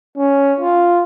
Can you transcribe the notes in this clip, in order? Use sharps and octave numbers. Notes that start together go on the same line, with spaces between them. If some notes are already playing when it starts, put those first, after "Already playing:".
C#4
F4